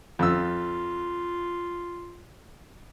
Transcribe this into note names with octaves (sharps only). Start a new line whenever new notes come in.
F2 F4 E6